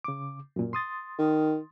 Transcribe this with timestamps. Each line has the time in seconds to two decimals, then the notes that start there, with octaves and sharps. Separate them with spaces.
0.04 C#3 D6
0.56 F#2 A#2
0.73 C6 D#6 A6
1.18 D#3